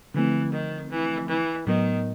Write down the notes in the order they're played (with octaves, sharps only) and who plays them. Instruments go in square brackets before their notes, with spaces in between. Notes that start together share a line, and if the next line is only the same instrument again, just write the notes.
[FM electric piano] D3 F3 A3 C4 [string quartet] E3
[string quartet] D#3
E3
E3
[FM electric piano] A2 F#3 B3 [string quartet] D#3